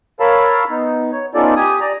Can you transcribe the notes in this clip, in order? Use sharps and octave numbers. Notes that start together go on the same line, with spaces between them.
A#4 C#5 F5 A5 B5 E6
B3 D#4
C#5
B3 C#4 D#4 F4 A4 D5
G4 G#5 D#6
D5 A#5